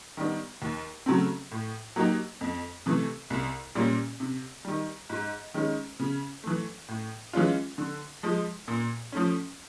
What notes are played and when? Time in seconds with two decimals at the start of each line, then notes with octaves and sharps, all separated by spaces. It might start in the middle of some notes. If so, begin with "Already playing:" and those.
0.17 D#3 G3 B3 D4
0.62 D#2
1.06 C#3 F#3 A3 C4
1.51 A2
1.96 F#3 A#3 D#4 G4
2.41 F2
2.86 C3 E3 A3
3.30 C2
3.75 A#2 G3 A#3 C#4
4.20 C3
4.65 D#3 G3
5.10 G#2
5.54 D#3 G#3 C#4
5.99 C#3
6.44 E3 A3
6.88 A2
7.33 E3 G#3 C#4 F4
7.78 D3
8.23 F3 G#3
8.68 A#2
9.12 F3 A3 C#4